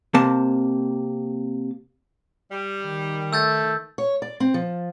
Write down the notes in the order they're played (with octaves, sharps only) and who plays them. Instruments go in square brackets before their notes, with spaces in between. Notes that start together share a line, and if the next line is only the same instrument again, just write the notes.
[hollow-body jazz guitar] C3 A#3 A5
[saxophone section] G3
[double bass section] D#3
[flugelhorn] A3 [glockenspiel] E6 G6 A6
[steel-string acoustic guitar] C#5
D5
C4
F3